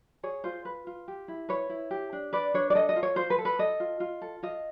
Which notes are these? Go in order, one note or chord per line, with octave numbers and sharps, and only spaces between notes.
G#4 C#5
F4 C5
B4
F4
G4
E4
B4 C#5
E4
G4
D4
B4 D5
D4 C#5
D5
A4 D#5
D#5
F4
C#5
F4 C5
B4
A4
B4
A4 D#5
F4
F4
A4
F4 D#5